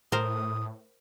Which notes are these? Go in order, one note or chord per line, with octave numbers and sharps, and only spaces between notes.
A2 A#4 C5 D#6